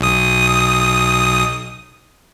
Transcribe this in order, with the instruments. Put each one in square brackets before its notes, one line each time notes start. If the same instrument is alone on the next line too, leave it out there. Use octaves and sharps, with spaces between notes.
[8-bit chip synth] B1 D#6